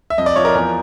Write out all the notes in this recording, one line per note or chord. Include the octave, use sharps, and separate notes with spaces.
E5
F2 D#5
D5
F3 C#5
A#4
E2 A#4